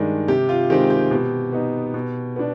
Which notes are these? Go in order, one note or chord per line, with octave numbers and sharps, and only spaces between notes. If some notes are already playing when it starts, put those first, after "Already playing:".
Already playing: G2 D#3 G#3 D4
C3 G4
F4
D#3 G#3 C4 G4
G4
B2 G4
B3 D#4
B2
B3 D4